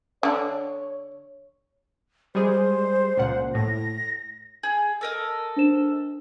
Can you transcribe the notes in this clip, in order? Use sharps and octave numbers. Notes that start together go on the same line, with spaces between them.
D3 D4 C#5
G3 G#3 G#4 C5
C#2 A#2 F#5
A2 A#6
G#4
A4 A#4 D#5
D4 C5 E7